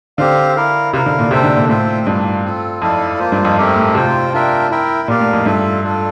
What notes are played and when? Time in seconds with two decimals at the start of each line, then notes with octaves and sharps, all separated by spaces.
0.18 D3 C4 G4 C5 F5
0.56 E4 A#4 F5
0.93 C3 E4 A#4 F5
1.06 D3
1.19 A#2
1.31 C3 D4 A4 C5 E5 G5
1.44 D3
1.56 A#2
1.69 A2 C4 F4 C5 E5 G5
2.07 G2 A#3 D4 F4
2.44 C4 F4 A4
2.82 F2 E4 A4 D5 F5
3.19 A#3 F4 C5
3.32 G2
3.45 F2
3.58 A3 C4 G4 A#4
3.76 A2
3.95 C3 F4 C5 G5
4.33 D4 F4 A#4 E5 G5
4.70 E4 A#4 E5 G5
5.08 A#2 G4 A#4 D5 F5
5.20 A2
5.33 F2
5.46 G2 F4 A4 E5
5.83 D4 F4 A4